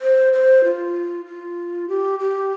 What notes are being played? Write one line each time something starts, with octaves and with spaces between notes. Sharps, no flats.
C5
C5
F4
F4
G4
G4